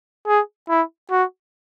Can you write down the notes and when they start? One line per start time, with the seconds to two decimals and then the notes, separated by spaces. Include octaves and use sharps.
0.27 G#4
0.69 E4
1.11 F#4